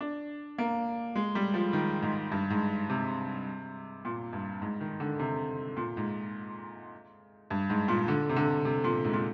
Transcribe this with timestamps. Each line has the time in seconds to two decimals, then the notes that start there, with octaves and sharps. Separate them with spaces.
0.01 D4
0.58 A#3
1.15 G#3
1.35 G3
1.54 F3
1.73 D#3
2.02 G#2
2.32 G2
2.50 G#2
2.90 C3
4.05 A#2
4.33 G2
4.62 G#2
4.81 D#3
5.00 D3
5.19 C3
5.77 A#2
5.97 G#2
7.51 G2
7.70 G#2
7.88 A#2
8.08 D3
8.29 C3
8.36 D3
8.65 C3
8.84 A#2
9.04 G#2
9.13 A#2